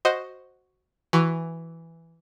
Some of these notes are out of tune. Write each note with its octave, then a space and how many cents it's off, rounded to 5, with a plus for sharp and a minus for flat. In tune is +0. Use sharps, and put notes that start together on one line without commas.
F#4 +0 C5 +0 D#5 +0
E3 +5 F#4 +0